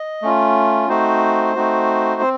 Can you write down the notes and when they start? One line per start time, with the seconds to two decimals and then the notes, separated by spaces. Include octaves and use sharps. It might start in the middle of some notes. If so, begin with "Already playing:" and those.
Already playing: D#5
0.22 A3 C#4 F4
0.88 A3 C4 D#4 F#4 C5
1.55 A3 C4 D#4 F#4
2.22 C4